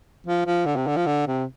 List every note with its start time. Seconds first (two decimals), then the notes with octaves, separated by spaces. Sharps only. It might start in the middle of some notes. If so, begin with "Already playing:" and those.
0.27 F3
0.46 F3
0.66 D3
0.76 C3
0.87 D3
0.97 F3
1.06 D3
1.27 C3